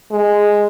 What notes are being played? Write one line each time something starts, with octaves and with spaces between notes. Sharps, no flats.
G#3